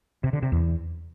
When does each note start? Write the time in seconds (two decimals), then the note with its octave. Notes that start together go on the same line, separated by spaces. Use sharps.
0.24 C3
0.33 D3
0.43 C3
0.52 E2